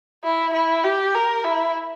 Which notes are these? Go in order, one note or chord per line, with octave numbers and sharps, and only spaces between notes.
E4
E4
G4
A#4
E4